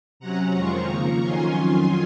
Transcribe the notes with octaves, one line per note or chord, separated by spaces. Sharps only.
C3 F#3 C#4 F#5 A#5
F2 D#3 G#3 C4 F4 A#5 C#6
C#3 F3 A#3
F2 D#3 F#3 C#4 F4 G#5 C6